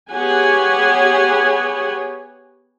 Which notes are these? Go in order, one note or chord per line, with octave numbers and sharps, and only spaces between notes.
B3 G4 G#4 C#5 F#5 G#5